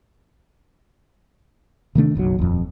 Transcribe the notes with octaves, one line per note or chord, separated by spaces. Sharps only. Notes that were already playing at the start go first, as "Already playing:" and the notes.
C3 D#3 A3 D4
F#1 B1 D3 F#3
D#1 F2